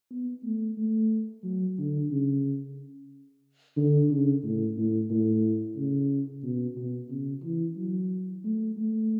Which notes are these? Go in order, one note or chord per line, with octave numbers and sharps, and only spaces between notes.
B3
A3
A3
F#3
D3
C#3
D3
C#3
A2
A2
A2
C#3
B2
B2
C#3
E3
F#3
A3
A3